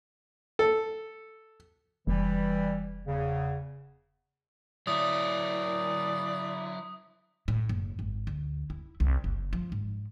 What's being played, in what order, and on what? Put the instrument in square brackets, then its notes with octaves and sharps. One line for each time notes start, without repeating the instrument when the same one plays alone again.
[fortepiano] A4
[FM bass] F1 [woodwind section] E3 G3
[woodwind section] E2 C#3
[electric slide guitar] F#3 E4 [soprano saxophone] D5 [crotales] D#6
[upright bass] A2
F#1
G#1
D2
E4
C2
F#1
F3
G#2